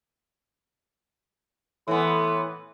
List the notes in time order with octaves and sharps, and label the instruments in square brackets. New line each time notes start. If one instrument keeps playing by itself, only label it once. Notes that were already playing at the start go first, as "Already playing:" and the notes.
[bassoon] A2 [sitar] E3 B3 [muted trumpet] C6